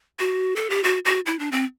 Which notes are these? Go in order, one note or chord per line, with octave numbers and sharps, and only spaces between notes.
F#4
A4
G4
F#4
F#4
E4
D4
C4